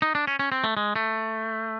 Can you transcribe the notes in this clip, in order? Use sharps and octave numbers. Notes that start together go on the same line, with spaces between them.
D#4
D4
C#4
C#4
C4
A3
G#3
A3